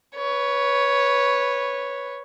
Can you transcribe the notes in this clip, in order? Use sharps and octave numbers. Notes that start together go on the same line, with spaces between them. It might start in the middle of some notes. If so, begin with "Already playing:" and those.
B4 C#5